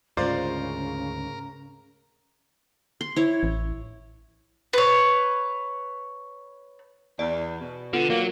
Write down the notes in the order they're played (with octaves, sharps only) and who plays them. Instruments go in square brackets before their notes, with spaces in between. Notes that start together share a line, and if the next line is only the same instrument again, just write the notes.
[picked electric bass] D2 G#2 G#3 [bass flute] C#3 [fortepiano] F4 C5 D5 [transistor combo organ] A#4
[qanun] C6
E4 C#5
[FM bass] A1
[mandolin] B4 C#5
[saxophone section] E2 [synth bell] D5
[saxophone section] B2
[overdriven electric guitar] D3 [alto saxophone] B3 [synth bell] F4
[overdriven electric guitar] F#3 [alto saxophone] A#3